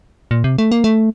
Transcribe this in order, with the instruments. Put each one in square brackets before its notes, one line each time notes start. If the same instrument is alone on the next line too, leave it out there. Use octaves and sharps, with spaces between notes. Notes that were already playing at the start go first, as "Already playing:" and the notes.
[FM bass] A#2
C3
A3
A#3
A3